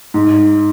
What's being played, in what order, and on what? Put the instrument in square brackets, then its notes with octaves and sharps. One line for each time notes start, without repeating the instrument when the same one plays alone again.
[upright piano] G#2